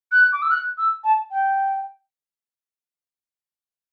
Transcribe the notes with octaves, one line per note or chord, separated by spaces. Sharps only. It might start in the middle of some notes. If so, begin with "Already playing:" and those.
F#6
D6
E6
F#6
E6
A5
G5